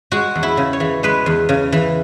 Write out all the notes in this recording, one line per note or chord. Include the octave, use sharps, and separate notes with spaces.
G#3 F#4
E2
E4
C#3
C#5
E3
G#3 B4
E2
C#3
E3